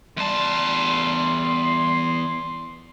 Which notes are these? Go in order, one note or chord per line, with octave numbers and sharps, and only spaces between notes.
E2 G3 A5 C6